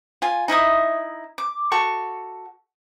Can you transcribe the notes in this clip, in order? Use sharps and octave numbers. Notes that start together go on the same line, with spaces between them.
F4 G#5
D#4 E4 E5 D#6
D6
F#4 A4 C#6